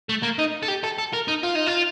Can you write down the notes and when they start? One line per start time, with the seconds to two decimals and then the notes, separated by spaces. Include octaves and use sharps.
0.09 A3
0.23 A#3
0.39 D#4
0.63 A4
0.68 G4
0.84 A4
0.98 A4
1.13 A#4
1.28 D#4
1.43 F4
1.55 D#4
1.67 F4